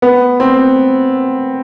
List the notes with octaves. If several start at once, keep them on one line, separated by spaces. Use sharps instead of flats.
B3
C4